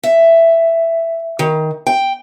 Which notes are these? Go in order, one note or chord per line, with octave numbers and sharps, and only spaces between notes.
E5
D#3
G5